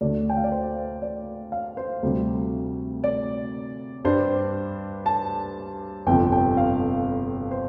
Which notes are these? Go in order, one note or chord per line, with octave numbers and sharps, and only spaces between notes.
D2 D3 A3 D4 D5
G5
F5
D5
C5
D5
F5
C5
D2 C3 G3
D5
G2 G3 D4 C5
A5
G1 F2 C3 F3 G5
G5
F5
C5